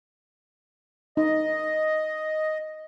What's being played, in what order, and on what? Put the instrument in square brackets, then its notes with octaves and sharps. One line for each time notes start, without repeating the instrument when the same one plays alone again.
[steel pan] D#4 [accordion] D#5